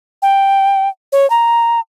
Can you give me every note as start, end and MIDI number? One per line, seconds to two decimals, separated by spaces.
0.22 0.89 79
1.12 1.29 73
1.30 1.80 82